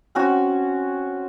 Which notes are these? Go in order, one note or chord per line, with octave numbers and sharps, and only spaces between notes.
C4 C#4 F#4